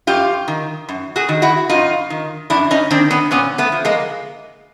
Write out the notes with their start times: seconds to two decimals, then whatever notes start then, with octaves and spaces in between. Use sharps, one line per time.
0.07 F#2 F4 G4
0.48 D#3
0.89 F#2
1.16 F#4 G#4
1.29 D#3
1.42 E4 F#4
1.69 F#2 D#4 F4
2.10 D#3
2.50 F#2 D4 E4
2.71 C#4 D#4
2.90 D#3 C4 D4
3.11 B3 C#4
3.31 A#2 B3 C#4
3.58 A3 B3
3.72 F3
3.85 G#3 A#3